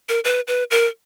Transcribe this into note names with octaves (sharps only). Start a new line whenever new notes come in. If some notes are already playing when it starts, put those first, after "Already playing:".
A#4
B4
B4
A#4